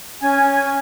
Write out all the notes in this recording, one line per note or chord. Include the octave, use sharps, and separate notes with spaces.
C#4 G#5